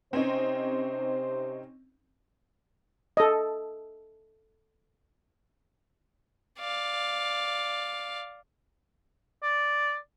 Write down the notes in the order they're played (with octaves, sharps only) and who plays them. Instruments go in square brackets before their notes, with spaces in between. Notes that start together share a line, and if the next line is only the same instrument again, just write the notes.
[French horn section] C3 C5 [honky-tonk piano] C4 C#4 D#4
[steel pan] A4 D#5
[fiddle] D5 F5
[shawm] D5